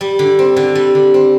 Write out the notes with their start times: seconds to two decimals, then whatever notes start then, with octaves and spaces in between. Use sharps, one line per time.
0.01 G3
0.19 D3
0.39 C4
0.56 D3
0.75 G3
0.95 D3
1.14 C4